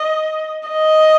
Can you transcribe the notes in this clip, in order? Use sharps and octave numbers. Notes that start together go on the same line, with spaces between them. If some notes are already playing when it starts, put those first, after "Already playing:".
Already playing: D#5
D#5